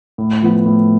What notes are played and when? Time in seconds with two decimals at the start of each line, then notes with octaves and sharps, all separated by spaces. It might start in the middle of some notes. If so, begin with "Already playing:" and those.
0.18 A2
0.43 F3 B3
0.66 A2